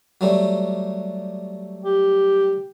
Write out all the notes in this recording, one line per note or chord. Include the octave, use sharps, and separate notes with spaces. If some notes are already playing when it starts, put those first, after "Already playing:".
F#3 G3 A3
G4